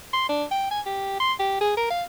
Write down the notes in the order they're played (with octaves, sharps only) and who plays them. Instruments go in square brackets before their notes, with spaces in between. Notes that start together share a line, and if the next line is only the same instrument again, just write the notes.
[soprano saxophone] C6
D4
G5
G#5
G4
C6
G4
G#4
A#4
F5